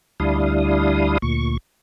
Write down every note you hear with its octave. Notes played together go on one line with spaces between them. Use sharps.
D2 G3 D4 E4 F5 D#6
D2 A#2 C#6